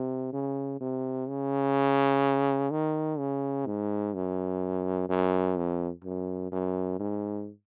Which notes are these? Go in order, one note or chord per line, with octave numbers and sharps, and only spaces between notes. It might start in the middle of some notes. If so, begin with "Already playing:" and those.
Already playing: C3
C#3
C3
C#3
D#3
C#3
G#2
F#2
F#2
F2
F#2
F#2
G#2